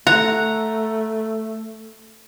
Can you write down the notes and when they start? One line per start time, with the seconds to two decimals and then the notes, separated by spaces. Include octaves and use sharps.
0.07 A3 F#5 A#5